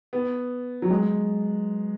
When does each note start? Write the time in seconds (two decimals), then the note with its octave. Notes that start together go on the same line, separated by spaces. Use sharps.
0.13 B3
0.82 F#3
0.90 G#3